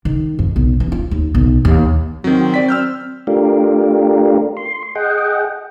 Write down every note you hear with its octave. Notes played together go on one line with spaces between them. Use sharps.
D#3
F2
B1
E3
F4
D#2
B1
D#2
D#3 F#3 C4
F#3 D5 B6
E6 F6 G6
A3 D4 F4 G4 A#4
C6
G#4 D#5 F#5 G5